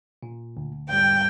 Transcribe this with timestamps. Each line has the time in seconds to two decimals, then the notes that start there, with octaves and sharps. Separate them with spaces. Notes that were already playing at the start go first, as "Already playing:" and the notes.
0.23 A#2
0.57 D2
0.89 E2 G#2 G3 G5